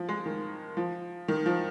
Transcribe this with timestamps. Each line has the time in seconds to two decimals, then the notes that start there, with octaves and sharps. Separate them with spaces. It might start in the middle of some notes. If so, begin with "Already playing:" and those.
Already playing: F3
0.09 G#3
0.26 D#3
0.77 F3
1.28 D#3
1.46 F3